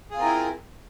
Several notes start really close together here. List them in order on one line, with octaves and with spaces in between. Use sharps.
G#4 F4 C4 A#4 E4